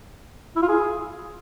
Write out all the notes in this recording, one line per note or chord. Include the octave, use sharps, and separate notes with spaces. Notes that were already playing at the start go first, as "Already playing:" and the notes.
E4
F4
G#4